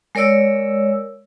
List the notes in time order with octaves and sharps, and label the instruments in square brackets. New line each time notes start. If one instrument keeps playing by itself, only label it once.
[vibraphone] G#3 A#4 C#5 D5 E6